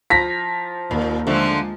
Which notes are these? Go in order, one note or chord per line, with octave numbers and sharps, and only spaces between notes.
F3 A#5 B6
D#2 A#2
D3 F3 G#3 A3